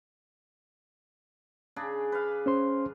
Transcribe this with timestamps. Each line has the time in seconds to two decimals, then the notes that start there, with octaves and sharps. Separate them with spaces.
1.76 C#3 D4 G#4
2.12 B4 F5
2.46 C#4 C5 C6